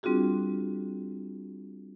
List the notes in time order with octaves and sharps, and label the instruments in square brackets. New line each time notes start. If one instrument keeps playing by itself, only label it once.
[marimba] G3 C4 D4 F4 F#4 G#4